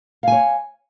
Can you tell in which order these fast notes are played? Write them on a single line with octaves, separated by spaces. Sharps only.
F5 G#5 C#5